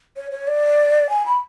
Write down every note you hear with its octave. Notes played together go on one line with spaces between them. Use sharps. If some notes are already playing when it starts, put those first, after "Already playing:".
C#5
C#5
D5
G#5
B5